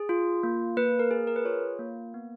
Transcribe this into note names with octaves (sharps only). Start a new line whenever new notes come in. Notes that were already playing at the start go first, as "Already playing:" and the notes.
Already playing: G#4
F4
A#3
A#3 B4
A#4
G#4
A#4
B4
F4 C#5
A#3
B3